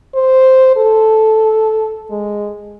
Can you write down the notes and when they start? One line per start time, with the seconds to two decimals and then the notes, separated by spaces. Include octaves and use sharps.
0.15 C5
0.76 A4
2.10 G#3